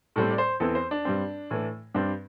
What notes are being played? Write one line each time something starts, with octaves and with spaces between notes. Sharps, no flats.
A2 G3 C4 A4
D5
C5
E2 E3 C4 A4
C5
D4
G2 G3 C4
A2 E3 A3
G2 G3 C4 D4